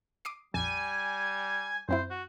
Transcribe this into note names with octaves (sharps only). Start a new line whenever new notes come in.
D6 D#6 C7
A#1 F2 G3 G#5
F#2 C4 E4 C5
F#4